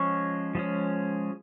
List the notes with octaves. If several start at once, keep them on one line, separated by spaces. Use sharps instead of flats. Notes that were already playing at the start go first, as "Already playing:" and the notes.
Already playing: F3 G#3 C#4 C#6
F3 G#3 C#4